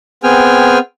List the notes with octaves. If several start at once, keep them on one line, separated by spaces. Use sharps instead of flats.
B3 C4 G#4 G5 G#5 F6